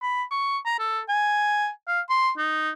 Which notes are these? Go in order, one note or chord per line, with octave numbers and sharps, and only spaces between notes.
B5
C#6
A#5
A4
G#5
F5
C6
D#4